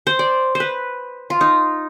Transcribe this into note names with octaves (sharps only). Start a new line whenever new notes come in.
C5
D5
C5
B4
F4
D#4